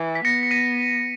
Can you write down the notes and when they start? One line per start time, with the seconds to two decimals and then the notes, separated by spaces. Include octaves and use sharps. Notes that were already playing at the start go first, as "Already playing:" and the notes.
Already playing: E3
0.15 B6
0.24 B3 A#6 C#7
0.43 C#7
0.51 B6 D#7